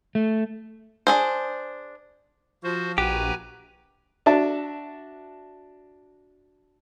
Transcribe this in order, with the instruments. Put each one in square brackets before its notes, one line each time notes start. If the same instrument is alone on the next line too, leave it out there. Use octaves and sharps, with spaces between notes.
[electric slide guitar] A3
[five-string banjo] D4 G#4 C5
[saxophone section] F3 [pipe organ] F#4 C5
[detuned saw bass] A#1 [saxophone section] F#4 [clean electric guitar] G4 [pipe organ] B4 G#5 A#5
[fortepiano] D4 F#4 E5 A5